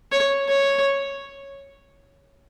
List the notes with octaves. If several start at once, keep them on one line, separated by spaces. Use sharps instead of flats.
C#5
C#5